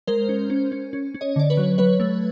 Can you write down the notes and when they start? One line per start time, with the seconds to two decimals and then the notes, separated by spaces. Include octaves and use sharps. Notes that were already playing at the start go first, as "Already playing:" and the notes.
0.07 G#3 A#4 C5
0.29 C#4
0.50 C#4
0.72 C#4
0.93 C#4
1.14 C#4
1.21 C#5 D#5
1.36 D3 D5
1.50 B4 C#5
1.57 F#3
1.78 F#3 B4 C#5
2.00 A3